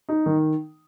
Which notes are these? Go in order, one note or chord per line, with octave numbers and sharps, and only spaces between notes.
D#4
D#3